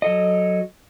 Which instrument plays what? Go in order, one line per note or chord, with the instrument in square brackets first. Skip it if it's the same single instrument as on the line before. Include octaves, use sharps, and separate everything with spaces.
[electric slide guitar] F#3 A4 D#5